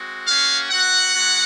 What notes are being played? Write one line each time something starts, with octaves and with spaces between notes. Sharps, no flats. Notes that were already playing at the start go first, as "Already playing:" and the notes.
Already playing: G#3 C4 F#4
A#3 C#4 F#4 F5
C4 F#4 F#5
G#3 C#4 F#4